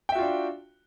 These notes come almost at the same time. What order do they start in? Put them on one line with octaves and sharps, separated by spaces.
G5 E5 F#4 F4 D4